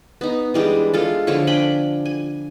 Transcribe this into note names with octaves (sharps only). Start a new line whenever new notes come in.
B3 D#4
E3 G3 G#3 D4
G#3 F4 A4
D3 F3 C#5 C#6
D4 G5 G#5 B5
G#5